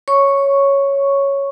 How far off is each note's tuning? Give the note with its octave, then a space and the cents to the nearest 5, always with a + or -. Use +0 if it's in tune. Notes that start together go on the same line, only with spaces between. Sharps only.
C#5 +0 C#6 +0